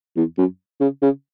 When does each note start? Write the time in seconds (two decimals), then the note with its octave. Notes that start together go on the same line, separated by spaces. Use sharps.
0.16 E2
0.38 F#2
0.81 C#3
1.02 C#3